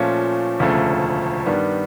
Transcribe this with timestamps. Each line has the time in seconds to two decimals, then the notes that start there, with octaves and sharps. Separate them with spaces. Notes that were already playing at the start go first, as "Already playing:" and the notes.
Already playing: A#2 F3 A3 C#4
0.59 E1 D2 C#3 F3 A3
1.46 G2 D#3 G3 B3